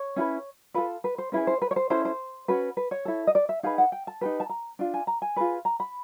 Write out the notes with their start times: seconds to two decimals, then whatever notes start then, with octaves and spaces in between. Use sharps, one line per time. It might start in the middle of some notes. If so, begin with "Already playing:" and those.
Already playing: C#5
0.16 C#4 E4 G#4 B4
0.74 F4 A4 B4
1.04 B4
1.18 C5
1.32 C#4 E4 G#4 B4
1.47 C5
1.62 B4
1.71 C#5
1.76 C5
1.90 C#4 E4 A4 C5
2.05 C5
2.48 C#4 F#4 B4
2.77 B4
2.91 C#5
3.05 E4 A4
3.27 D#5
3.35 D5
3.49 E5
3.63 D#4 G#4 B4 F5
3.78 F#5
3.92 G5
4.07 A5
4.21 D#4 G4 B4
4.40 A5
4.49 A#5
4.79 D4 F4
4.94 G#5
5.07 A#5
5.22 G#5
5.36 F4 G#4 B4
5.65 A#5
5.80 B5